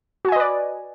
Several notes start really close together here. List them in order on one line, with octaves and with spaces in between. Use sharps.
F#4 G#5 D#5 B4 D5